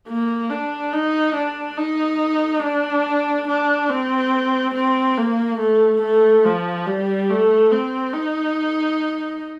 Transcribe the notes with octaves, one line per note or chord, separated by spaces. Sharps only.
A#3
D4
D#4
D4
D#4
D4
D4
C4
C4
A#3
A3
A3
F3
G3
A3
C4
D#4